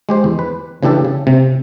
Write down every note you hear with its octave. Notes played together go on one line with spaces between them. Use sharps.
G#3 G4 C5
E2
B4
C#3 E3 D4 G4 A4
C#3
C3